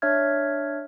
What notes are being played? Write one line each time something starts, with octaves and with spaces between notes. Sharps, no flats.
D4 C#5 E5 F6 G#6